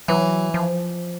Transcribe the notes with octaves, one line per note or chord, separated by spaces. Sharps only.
E3 F#3
F3